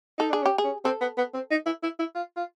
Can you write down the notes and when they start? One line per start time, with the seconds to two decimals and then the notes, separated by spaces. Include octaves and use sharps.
0.18 D#4 A4
0.30 D4 G#4
0.42 C#4
0.46 G4
0.58 G#4
0.64 C#4
0.85 C4 A4
1.01 B3
1.17 B3
1.34 C4
1.51 D#4
1.66 E4
1.83 E4
1.99 E4
2.15 F4
2.36 F4